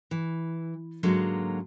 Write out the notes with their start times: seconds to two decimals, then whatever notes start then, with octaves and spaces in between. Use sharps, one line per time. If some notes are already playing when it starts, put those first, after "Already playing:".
0.11 E3
1.03 G#2 D3 F#3 G#3 A#3